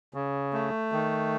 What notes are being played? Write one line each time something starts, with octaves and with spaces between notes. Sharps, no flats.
C#3
A3
D#3